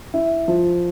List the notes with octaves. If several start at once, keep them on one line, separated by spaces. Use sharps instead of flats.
E4
F3